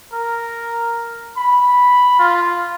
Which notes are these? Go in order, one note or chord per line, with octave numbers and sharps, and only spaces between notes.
A#4
B5
F4